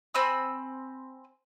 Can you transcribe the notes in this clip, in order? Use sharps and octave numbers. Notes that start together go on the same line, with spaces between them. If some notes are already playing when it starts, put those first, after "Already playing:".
C4 G#5 B5 E6